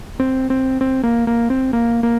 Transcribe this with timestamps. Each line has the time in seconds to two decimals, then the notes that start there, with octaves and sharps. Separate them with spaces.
0.20 C4
0.50 C4
0.81 C4
1.03 A#3
1.27 A#3
1.50 C4
1.73 A#3
2.03 A#3